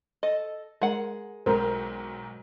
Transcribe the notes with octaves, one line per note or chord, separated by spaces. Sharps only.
A4 D#5
G#3 A#4 F#5
B1 G#2 A#4 C5